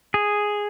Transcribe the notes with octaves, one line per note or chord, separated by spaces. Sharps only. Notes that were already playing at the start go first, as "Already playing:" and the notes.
G#4